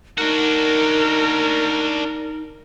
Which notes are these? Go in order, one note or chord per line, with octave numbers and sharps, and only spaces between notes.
D4 D#4 F#4 A#4